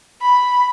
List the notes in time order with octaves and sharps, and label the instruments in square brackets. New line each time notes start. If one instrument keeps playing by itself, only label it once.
[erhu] B5